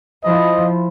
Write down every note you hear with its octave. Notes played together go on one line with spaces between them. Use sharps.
F3 E4 C5 D#5 B5